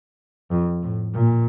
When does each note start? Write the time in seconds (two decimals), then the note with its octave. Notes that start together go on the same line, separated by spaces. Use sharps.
0.51 F2
0.83 A2
1.14 A#2